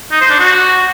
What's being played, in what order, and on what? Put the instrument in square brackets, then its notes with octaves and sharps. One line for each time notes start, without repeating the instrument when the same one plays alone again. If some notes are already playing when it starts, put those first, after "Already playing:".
[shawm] D#4
C5
D4
F#4